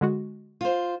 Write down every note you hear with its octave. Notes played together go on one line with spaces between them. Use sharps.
D3 G#3 F#4
F4 C5